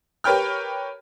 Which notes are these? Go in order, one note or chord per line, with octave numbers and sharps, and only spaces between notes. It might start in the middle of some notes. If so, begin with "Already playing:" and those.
G4 A#4 B4 C#5 G5 F6